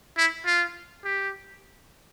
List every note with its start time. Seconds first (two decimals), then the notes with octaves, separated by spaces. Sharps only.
0.17 E4
0.46 F4
1.04 G4